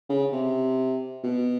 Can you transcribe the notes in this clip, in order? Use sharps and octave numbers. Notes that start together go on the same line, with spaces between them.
C#3
C3
B2